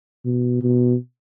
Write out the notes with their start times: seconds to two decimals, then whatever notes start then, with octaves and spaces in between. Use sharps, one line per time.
0.25 B2
0.62 B2